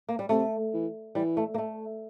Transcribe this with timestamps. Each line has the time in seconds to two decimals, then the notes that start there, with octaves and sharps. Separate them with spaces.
0.09 A#3
0.19 G3
0.29 C3 A3
0.73 E3
1.15 E3 G3
1.37 A3
1.54 A#3
1.58 A3